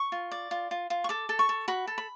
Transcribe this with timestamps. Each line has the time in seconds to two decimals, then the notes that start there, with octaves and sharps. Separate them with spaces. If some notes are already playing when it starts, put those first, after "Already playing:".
Already playing: C#6
0.12 F4
0.31 D5
0.51 F4
0.71 F4
0.90 F4
1.04 C#6
1.09 A4 D6
1.29 A4
1.39 C#6
1.49 A4
1.68 F#4 B5
1.87 A4
1.98 B5